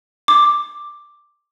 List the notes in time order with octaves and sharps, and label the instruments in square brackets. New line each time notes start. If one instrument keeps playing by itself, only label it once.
[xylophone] D6